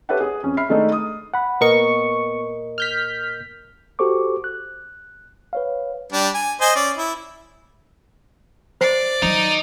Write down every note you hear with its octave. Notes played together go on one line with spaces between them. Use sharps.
G4 A4 B4 C#5 E5 F#5
G#4 D#6
F2 C#4
E5 B5 F6 C7
D#3 G#3 A3 D4 D#4 A4
D#6
F#5 B5
A#2 B3 A#4 D#5 C#6
F6 G6 B6
F#4 G4 A4 C5 C#6 D6
F#6
B4 C#5 F5
G3 D4
G#5
C5 D#5 G#5
C#4 D5
E4
C5 D5 C7
D#3 F#3 D#5 A#5